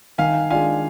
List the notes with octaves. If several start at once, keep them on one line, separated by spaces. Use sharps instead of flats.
D#3 F5 G#5
G#3 D4 F4 F5 G#5